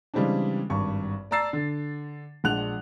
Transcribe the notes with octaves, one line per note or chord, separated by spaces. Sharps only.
C#3 E3 G3 G#3 C4 D4
G#1 G2 C#6
D5 A5 A#5 E6 A6 C7
D3
A#1 G#3 D4 F#5 F#6 F7